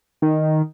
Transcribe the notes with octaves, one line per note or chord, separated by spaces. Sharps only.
D#3